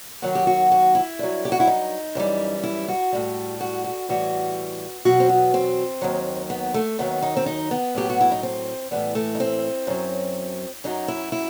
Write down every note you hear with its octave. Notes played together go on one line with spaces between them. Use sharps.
D#2 D#3 F#3 F#4
G4
F#4
F#4
E4
G2 F#3
G4
F#4
E4
D#4
F#2 E3 G3
E4
F#4
A2 G3
F#4
F#4
A2 E3 G3 F#4
E2 B2 F#3 F#4
C4
B3
C4
D#2 D#3 F#3
B3
A3
D#2 D#3 F#3 B3
D#4
C4
D#4
B3
A2 F#3 G4
F#4
E4
D#4
C4
A2 E3 G3 B3
A3
D#4
C4
F#2 F#3
F#2 F#3 D#4
E4
E4